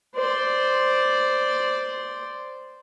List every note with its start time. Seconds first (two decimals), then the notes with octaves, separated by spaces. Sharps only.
0.15 C5 D5